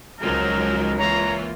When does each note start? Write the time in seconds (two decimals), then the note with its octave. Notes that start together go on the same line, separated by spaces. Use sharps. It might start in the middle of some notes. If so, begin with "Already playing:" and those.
0.20 C#2 F3 F#3 G#3 D#4 A#4
0.98 E3 A#3 F4 C#5 A#5